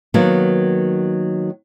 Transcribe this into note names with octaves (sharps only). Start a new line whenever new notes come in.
D#3 F#3 A#3 B3